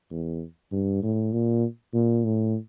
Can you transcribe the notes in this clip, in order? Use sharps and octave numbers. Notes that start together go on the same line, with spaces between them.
E2
G2
A2
A#2
A#2
A2